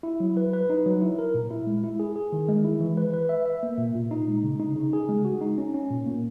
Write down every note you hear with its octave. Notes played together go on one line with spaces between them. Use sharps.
E4
F#3
B4
B4
D#4
F#3
E4
A#4
A#2
E4
G#3
E4
G#4
G#4
D#3
G#3
E4
E3
B4
B4
E5
E5
A#3
A#2
A#2
D#4
G#3
C#3
D#4
C#3
G#4
G#3
F#4
D#4
C#4
C#4
A#2
A#3